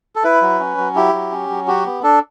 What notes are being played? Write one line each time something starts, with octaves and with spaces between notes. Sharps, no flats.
A4
E4 B4
F#3
C#4
F#3
E4 G4
F#3
C#4
F#3
F#4 G4
B3
D4 A4